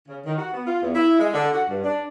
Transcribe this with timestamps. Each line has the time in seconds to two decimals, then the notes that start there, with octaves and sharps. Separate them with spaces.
0.08 C#3
0.24 D#3
0.38 F#4
0.53 B3
0.67 F4
0.82 E2
0.94 E4
1.19 G#3
1.33 D3
1.53 F#4
1.69 G2
1.83 D4